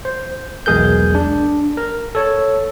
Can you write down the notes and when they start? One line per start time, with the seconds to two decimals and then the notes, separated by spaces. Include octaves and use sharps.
0.05 C5
0.66 B1 E2 G#3 G#4 A#4 G6
1.15 D4
1.77 A#4
2.15 A4 C#5